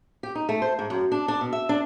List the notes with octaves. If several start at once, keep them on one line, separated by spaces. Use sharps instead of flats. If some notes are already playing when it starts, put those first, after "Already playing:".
G4
D#4
A3
C5
G#2
F#2
D4
D4
B2
E5
D4